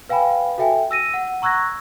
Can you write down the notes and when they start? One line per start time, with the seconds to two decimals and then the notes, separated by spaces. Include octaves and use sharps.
0.09 B4 F5 G5 G#5 B5
0.58 F#4 A4 E5 G5 G#5
0.91 E6 A#6 D#7
1.14 F#5
1.42 A#5 C#6 E6 F#6 G#6 A#6